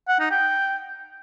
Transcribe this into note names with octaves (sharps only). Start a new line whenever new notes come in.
F#5
D#4
G5